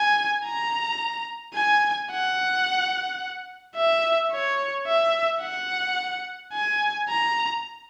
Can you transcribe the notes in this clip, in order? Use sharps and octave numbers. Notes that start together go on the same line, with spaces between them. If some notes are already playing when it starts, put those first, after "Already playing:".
Already playing: G#5
A#5
G#5
F#5
E5
C#5
E5
F#5
G#5
A#5